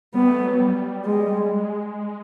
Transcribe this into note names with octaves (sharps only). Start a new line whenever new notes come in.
G3 B3
A3
F#3
G3
G#3
G#3